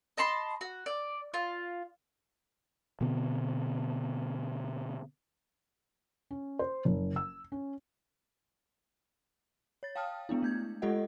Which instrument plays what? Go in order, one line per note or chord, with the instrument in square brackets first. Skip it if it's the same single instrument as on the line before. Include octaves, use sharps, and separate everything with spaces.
[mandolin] D#5 A5 B5 C6
F#4
D5
F4
[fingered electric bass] B2 D3 B3 C4
[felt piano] C#4
C5
F#1
E6
C#4
[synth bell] C#5 A6
F5 G5 A5 D#6 F6
G#3 B3 D4 E4
A3 G6 G#6
G#3 F4 G4 A4 D#5 F#5